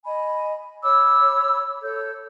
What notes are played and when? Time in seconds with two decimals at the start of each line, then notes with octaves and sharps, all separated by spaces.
0.05 D#5 G#5 B5
0.84 C#5 B5 D6 E6
1.82 A4 C#5 G6